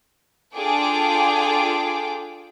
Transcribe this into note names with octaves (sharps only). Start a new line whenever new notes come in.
D4 F4 G#4 A4 G5 D6